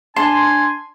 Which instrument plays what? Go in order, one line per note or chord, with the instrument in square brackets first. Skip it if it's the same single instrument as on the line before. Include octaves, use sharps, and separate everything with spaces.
[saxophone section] D4 [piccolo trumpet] G#5 [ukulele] A5 [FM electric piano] C6